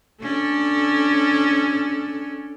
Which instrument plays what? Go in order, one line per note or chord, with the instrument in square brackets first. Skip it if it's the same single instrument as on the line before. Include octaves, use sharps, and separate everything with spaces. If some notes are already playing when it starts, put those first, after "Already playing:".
[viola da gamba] C#4 D4 A4